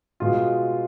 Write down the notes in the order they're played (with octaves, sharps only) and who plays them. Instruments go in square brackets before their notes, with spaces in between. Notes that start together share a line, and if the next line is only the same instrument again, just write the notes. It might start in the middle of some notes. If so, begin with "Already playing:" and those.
[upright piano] B2 G#3 F4